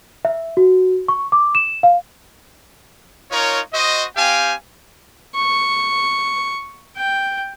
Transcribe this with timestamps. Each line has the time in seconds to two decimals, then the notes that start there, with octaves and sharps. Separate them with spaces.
0.25 E5
0.57 F#4
1.08 C#6
1.32 D6
1.55 E7
1.83 F5
3.31 D#4 F4 A#4 C#5
3.73 F#4 C5 D#5
4.16 C4 G4 F5 G5 G#5
5.35 C#6
6.96 G5